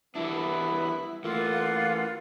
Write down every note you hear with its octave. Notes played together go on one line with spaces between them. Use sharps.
E3 G3 B3 D4 E4
E3 A3 A#3 F4 F#5